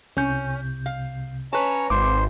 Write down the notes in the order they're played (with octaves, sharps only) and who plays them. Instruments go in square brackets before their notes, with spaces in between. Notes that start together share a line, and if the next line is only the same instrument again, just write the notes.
[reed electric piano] C2 C3 G6 [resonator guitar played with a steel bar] C#4
[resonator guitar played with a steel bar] F5
[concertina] C#4 C#5 A#5 [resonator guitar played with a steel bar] B4 A5
[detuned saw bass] G#1 [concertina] C5 [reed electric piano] D6